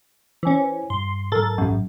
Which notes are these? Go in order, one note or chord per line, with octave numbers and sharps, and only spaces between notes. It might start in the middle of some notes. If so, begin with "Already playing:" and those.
E3 C#4 C5 G#5
G2 C6
G#2 F#3 A4 A#4 A6
A1 F#2